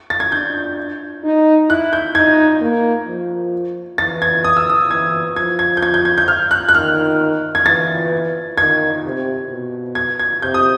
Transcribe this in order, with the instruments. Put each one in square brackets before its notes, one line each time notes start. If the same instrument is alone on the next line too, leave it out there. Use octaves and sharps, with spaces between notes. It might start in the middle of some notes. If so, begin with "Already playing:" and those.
[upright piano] A6
G#6
[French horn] D4 [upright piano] G6
[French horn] D#4
[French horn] E4 [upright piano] F#6
[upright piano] G6
[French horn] D#4 [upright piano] G#6
[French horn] A#3
F3
[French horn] E3 [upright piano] A6
[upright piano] G#6
D#6
E6
D#6
[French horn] E3 [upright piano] G#6
[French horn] F3 [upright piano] G#6
[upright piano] G#6
G6
G#6
G6
G#6
G6
F6
F#6
F#6
[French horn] D#3 [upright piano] F6
[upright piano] G#6
[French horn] E3 [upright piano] A6
[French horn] D#3 [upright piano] G#6
[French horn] C3
B2
[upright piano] G#6
G#6
[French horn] C3 [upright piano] G6
[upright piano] D#6